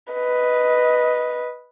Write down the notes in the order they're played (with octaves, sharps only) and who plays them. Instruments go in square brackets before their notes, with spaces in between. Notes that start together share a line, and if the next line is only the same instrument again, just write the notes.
[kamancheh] B4 D#5